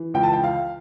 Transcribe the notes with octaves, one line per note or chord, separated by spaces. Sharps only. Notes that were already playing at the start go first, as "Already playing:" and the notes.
Already playing: E3
C#2 G5
A5
G5
F5